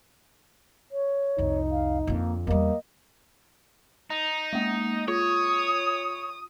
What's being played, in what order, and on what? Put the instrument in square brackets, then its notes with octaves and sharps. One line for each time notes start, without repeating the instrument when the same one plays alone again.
[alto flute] C#5
[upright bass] C2 F2 [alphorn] D#4
[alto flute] F5
[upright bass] F2 D3 [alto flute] A#3
[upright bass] E2 G3 [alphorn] A#3 [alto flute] D#5
[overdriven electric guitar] D#4
[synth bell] G#3 A#3
[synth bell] F4 [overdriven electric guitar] C#5 [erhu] D#6